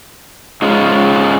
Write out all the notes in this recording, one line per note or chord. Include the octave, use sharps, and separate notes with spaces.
G#2 G#3 C#4 F4